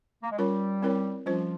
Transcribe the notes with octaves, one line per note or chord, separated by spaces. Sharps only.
A#3
G#3
G3 C#4 F4 A#4 C#5
C4 E4 A#4 C#5
F3 G3 C#4 F4 C5